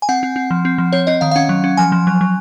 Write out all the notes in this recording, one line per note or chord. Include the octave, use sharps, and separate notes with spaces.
G#5
C4 F#5
C4
C4
F3
C4
F3
C4 C#5
C4 D#5
D#3 F5
F5
C#4 F#5
F#3
C#4
F3 G#5
F3
F#3
F#3